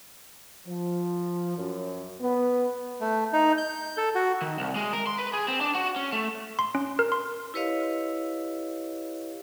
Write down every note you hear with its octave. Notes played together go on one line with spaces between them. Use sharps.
F3
F#2
B3
A3
D#4
G6
A4
F#4
D#3
C2
G#3
A#4
C6
B4
G#4
C4
D4
F#4
C#4
A3
C6
C#4
A#4
C6
E4 G4 B4 C#5 D#5 F5